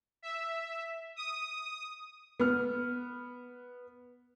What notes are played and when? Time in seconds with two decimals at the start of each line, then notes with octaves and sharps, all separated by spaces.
0.22 E5
1.16 D#6
2.40 B3 F6